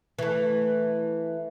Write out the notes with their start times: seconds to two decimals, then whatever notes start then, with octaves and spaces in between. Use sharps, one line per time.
0.19 E3 A3